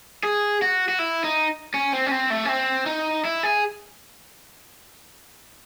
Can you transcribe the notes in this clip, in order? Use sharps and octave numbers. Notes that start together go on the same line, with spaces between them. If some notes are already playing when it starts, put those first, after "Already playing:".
G#4
F#4
F#4
E4
D#4
C#4
C4
C#4
C4
A3
C#4
C4
D#4
E4
G#4